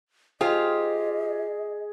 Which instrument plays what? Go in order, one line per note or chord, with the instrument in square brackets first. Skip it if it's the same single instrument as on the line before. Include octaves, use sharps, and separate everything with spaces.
[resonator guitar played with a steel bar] F4 G4 C5 [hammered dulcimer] G#4 [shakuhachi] D#5